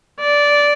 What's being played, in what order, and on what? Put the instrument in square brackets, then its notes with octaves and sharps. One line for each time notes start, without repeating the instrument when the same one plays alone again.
[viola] D5